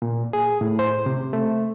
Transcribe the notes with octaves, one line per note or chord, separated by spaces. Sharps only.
A#2
G#4
A2
C5
C3
A3